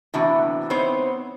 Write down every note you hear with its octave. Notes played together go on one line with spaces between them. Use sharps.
A2 C3 E3 B3 D4 F#4
B3 C4 D#4 C5 C#5